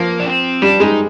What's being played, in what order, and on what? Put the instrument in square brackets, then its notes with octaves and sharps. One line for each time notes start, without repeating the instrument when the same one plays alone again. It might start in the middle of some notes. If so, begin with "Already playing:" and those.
Already playing: [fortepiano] F3 [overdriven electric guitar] A#3
[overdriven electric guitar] D4
C4
[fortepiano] G3 [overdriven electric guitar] D4
[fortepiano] G#3 [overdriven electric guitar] D#4